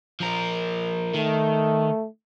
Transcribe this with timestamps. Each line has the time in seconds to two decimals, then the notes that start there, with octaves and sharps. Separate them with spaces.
0.20 F3 A#4
1.15 D#3 A3